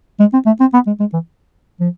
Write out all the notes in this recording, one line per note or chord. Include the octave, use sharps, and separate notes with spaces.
G#3
C4
A3
C4
B3
G#3
G#3
E3
F3